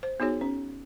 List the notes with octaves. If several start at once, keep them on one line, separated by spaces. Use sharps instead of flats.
C5
B3 D#4 F#4 G#4 C#5
C#4